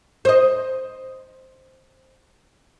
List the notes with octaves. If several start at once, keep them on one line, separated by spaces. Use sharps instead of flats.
C5 D#5